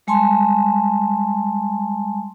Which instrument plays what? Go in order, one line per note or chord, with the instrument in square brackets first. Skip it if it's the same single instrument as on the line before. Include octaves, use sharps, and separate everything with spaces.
[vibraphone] G3 G#3 G#5 A5 C6